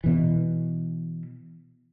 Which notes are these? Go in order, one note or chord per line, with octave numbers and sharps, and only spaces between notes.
B2 E3